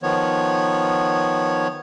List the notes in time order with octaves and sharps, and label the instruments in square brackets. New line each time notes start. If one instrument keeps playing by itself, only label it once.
[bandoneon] D#3 F3 B3 C#5